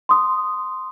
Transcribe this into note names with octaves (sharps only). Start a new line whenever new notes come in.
C6 D#6